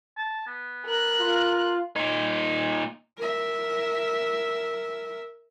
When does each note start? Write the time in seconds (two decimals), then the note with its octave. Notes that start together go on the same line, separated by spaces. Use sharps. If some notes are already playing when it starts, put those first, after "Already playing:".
0.17 A5
0.47 B3
0.85 A#4 F#6
1.20 F4
1.96 A#2 D#4
3.18 A#4 E5